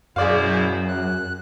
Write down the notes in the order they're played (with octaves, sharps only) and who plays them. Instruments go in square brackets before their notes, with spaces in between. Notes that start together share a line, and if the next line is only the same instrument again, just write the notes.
[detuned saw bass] F#2 [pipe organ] B2 E4 C5 [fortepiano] G#4 D5 F5
[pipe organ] F#6